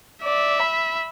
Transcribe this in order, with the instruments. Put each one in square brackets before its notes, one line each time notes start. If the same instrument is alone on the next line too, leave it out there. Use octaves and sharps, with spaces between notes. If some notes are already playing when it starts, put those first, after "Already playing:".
[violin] D5 [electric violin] E5
[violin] B5